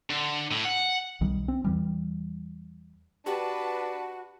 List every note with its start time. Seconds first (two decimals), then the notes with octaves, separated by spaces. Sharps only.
0.10 D3
0.51 A2
0.65 F#5
1.21 B1 D#3 G3
1.48 C4
1.64 E2 E3 G3
3.26 D4 F#4 G4 B4 G5 A5